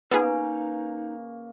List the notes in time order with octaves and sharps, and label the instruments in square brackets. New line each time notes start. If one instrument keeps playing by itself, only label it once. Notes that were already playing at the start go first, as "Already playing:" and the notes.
[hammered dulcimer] C#3 A#3 [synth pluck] B3 F4 G#4 [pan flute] D#4 [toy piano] B4 G#5